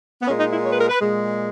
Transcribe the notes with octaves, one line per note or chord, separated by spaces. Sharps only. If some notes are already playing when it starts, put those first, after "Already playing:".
B3
A#2 G#3 C#4
D#4
E4
C#5
B4
A#4
B4
A#2 G#3